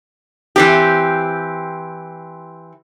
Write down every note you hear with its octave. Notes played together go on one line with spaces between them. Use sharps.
E3 C4 G4